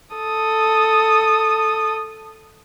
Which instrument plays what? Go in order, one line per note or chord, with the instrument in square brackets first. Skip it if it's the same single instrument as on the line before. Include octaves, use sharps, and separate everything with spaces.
[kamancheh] A4 D#6